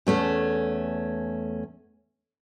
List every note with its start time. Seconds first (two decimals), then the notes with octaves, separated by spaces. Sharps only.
0.07 E2 A3 C#4